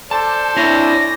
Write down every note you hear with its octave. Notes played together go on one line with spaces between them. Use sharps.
A4 C5 D5 A5
D4 E4 C#5 A#6